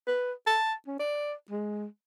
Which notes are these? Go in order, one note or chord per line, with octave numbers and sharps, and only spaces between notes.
B4
A5
C#4
D5
G#3